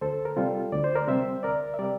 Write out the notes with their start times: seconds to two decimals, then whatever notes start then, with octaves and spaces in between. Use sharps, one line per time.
0.01 D2 A4 C5
0.25 A#4
0.36 C3 G3 F4 A4
0.72 D2 D5
0.84 C5
0.95 A#4 D5
1.07 C3 G3 C5 E5
1.43 D2 A#4 D5
1.74 E5
1.79 C3 G3 A#4 D5